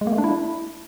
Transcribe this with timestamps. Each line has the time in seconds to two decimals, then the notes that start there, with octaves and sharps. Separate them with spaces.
0.01 G#3
0.07 A#3
0.13 A3
0.18 D4
0.24 E4